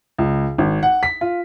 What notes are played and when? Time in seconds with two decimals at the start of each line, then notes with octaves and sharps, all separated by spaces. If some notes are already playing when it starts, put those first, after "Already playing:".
0.18 C#2
0.58 G#1
0.83 F#5
1.03 B6
1.21 F4